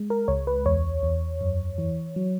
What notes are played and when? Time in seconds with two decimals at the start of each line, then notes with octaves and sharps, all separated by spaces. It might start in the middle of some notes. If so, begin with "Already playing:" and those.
Already playing: G#3
0.10 A#4
0.28 C#2 C#5
0.47 B4
0.66 E2 C#5
1.03 E2
1.41 F#2
1.78 E3
2.16 F#3